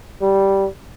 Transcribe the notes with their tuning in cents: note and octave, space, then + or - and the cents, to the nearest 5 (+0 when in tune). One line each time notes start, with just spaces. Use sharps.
G3 -10